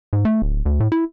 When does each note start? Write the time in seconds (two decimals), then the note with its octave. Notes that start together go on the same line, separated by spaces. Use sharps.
0.13 G#2
0.25 A3
0.42 D1
0.66 D2
0.80 A2
0.92 E4